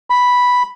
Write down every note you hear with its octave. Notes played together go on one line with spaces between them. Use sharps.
B5